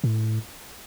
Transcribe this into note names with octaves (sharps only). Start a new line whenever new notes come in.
A2